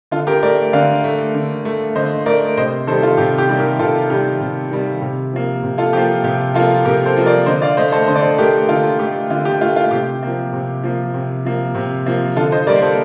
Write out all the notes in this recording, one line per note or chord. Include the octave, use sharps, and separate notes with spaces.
D3 F4 A4
G4 A#4
A3 A#4 D5
D3 D5 F5
A3
D3
A3
D3 C5 D#5
A3 A#4 D5
C3 C5 D#5
D#3 G3 A4 C5
F4 A4
C3 G4
G4
D#3 G3
G4 A#4
C3 F4 A4
D#3 G3 G4
C3
D#3 G3
C3
F3 A#3
C3
F4 A4
F3 A#3 G4
C3 G4
F3 A#3 F4 A4
C3 G4 A#4
A4 C5
F3 A#3
A#4 D5
D3 C5 D#5
D5 F5
A3 C5 D#5
A4 C5
D3 C5
D5
A4 C5
A3 G4 A#4
D3 F4 A4
A3 G4
D3 F4
G4
A3 F4
F4
C3 G4
F3 A#3
C3
F3 A#3
C3
F3 A#3
C3
F3 A#3
D3 F4 A4
C5 D#5
G3 A#3 A#4 D5
A4 C5